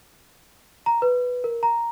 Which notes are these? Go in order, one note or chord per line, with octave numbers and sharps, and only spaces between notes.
A#5
B4
A#4
A#5